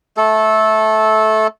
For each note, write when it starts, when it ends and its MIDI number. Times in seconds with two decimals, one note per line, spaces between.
0.17 1.47 57
0.17 1.47 69